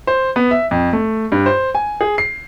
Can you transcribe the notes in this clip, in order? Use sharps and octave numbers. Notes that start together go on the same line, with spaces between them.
C5
B3
E5
F2
A3
G2
C5
G#5
G#4
C7